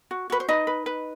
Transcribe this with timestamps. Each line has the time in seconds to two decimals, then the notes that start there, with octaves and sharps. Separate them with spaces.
0.11 F#4
0.30 F#4 B4
0.40 C5
0.48 D#4 B4 D#5
0.67 B4
0.86 B4